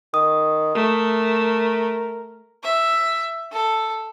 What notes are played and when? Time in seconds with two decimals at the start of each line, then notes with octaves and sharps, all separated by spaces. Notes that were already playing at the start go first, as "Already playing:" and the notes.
0.14 D#3 D#6
0.75 A3 A#4
2.63 E5
3.52 A4